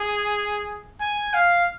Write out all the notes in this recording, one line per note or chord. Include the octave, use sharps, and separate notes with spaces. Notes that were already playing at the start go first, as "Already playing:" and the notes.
Already playing: G#4
G#5
F5